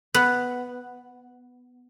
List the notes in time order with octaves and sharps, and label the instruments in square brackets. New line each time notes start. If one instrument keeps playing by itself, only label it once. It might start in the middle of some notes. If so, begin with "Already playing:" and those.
[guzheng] B3 [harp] F#6